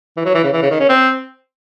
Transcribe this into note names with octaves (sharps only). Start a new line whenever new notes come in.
E3
F#3
E3
C#3
E3
C#3
D#3
C#4
C4